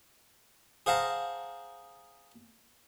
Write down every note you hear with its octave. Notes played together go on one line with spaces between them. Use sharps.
G#4 C5 F5 F#5 A5 A#5